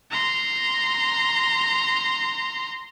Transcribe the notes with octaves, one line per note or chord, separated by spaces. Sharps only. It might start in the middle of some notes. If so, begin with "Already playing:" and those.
A#5 C6